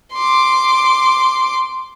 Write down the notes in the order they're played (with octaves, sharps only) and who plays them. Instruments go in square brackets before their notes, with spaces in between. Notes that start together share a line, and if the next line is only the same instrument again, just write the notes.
[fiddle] C6 D6